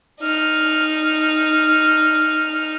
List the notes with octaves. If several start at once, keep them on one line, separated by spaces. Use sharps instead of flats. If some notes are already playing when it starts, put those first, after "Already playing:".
D#4 F6